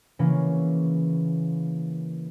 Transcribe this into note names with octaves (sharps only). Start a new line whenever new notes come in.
C#3 E3 A#3 C#4